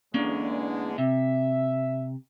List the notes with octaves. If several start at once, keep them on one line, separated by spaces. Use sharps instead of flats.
E2 D3 G#3 A#3 C#4 D4
C3 E5